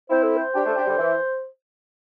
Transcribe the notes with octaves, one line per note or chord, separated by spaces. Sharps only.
C4 E4 C5
A4
C5
D4 G4
A3 D4
D4 G4
D3 G3
E3